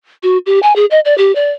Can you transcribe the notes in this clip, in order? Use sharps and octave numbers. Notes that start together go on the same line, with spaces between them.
F#4
G4
G#5
G#4
D#5
D5
G4
D5